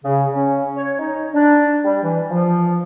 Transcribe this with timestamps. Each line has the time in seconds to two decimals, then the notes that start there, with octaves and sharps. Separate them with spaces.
0.04 C#3
0.33 C#4
0.76 C#5
0.99 D#4
1.34 D4
1.84 G3
2.03 E3
2.31 F3